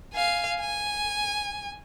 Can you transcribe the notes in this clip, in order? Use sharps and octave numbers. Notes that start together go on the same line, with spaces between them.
F5 G#5
G#5